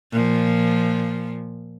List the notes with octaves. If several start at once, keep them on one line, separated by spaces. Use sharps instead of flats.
A#2 F3